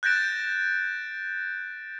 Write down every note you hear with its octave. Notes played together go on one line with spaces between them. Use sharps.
F#6 G6 A6 A#6 D7 E7